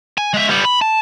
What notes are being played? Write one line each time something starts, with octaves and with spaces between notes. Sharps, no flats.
G#5
G#3 E5
G3 B3
B5
A5